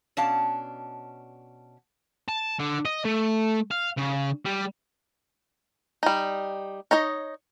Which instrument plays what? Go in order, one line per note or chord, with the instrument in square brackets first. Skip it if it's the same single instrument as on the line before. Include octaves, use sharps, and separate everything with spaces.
[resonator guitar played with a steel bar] B2 C#4 D4 F5 A5
[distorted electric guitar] A5
D3
D#5
A3
F5
C#3
G3
[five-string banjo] G3 D#4
D#4 C#5 D#5